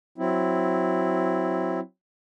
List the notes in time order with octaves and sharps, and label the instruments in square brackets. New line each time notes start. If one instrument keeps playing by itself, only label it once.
[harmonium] F#3 C4 E4